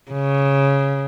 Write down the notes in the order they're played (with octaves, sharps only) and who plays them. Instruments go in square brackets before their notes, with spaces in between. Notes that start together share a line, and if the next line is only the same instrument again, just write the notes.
[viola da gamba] C#3